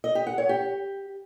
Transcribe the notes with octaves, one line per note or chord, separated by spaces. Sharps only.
D#5
G4
F#5
C#5
G4